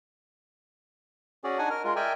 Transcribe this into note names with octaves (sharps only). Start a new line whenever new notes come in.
C#4 F#4 G#4 D5
D4 D#4 F#5 G#5
A#4 F6
G#3 F4 A#4
A#4 D5 E5 G5 G#5